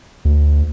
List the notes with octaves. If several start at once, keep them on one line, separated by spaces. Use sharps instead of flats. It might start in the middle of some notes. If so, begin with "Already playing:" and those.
D2